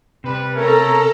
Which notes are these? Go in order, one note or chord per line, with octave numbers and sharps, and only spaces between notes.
C3 G3 B4
A3 C#4 A4 A#4 A#5